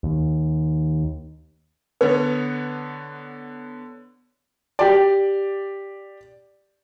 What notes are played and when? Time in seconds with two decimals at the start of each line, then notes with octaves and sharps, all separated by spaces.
0.03 D#2
2.01 D3 B3 B4 C#5
4.79 G4 D5